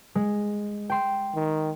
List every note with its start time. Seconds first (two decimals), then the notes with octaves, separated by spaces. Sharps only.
0.15 G#3
0.90 G5 C6
1.35 D#3